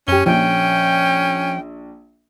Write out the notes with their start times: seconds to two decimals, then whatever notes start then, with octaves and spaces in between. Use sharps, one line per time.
0.08 F#2 C#4 G4 G7
0.26 A#1 F3 C#4 G5